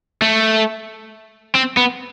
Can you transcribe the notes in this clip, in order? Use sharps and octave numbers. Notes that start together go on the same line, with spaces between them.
A3
C4
B3